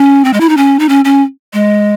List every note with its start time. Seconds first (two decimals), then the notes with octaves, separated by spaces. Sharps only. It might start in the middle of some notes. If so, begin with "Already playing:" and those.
Already playing: C#4
0.25 C4
0.33 G#3
0.40 E4
0.49 D#4
0.57 C#4
0.79 D#4
0.89 C#4
1.05 C#4
1.53 G#3